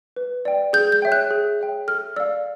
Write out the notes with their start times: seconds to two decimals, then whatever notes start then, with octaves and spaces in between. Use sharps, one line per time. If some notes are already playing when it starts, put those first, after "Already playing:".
0.16 B4
0.45 D5 G5
0.73 G#4 G6
0.92 G6
1.02 C#5 E5 G5
1.12 F#6
1.31 G#4
1.59 C#5 E5 G5
1.88 A4 F6
2.16 D5 F5 E6